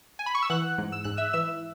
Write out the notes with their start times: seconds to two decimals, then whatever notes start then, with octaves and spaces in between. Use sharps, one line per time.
0.19 G#5
0.26 B5
0.35 C#6
0.42 E6
0.50 E3 F#5 F#6
0.78 G#2
0.92 E6
1.04 G#2 F#6
1.17 E5 E6
1.33 E3 E5 E6